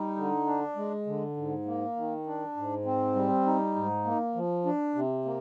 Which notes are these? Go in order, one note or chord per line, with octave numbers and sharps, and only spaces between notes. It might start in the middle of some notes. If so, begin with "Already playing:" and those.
Already playing: G3 D#4
D3
D4
G#3
D3
G#2
A#3
D#3
D4
G#2
C4
G3
D#4
G#2
A#3
F3
D4
C3
A#3